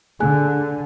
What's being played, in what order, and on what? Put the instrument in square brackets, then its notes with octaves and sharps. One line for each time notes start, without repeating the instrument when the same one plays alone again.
[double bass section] D3 [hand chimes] G#4 G#5 F#6